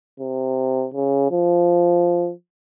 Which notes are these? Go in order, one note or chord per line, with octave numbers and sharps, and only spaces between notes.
C3
C#3
F3